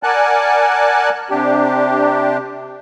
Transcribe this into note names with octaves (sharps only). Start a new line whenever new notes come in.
A#4 D5 F#5 G#5 A5 F#6
C3 D4 G4